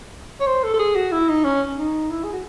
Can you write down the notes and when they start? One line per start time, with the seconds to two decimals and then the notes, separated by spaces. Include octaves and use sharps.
0.40 C#5
0.47 C5
0.63 A4
0.74 A4
0.79 G#4
0.96 F#4
1.12 E4
1.29 D#4
1.44 C#4
1.78 D#4
2.10 E4
2.24 G#4
2.33 F#4